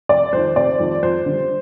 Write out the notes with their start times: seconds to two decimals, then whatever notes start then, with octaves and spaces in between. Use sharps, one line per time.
0.09 F1 D5
0.33 F2 D#3 C5
0.56 F1 D5
0.79 F2 D#3
1.03 F2 C5
1.26 D3 G3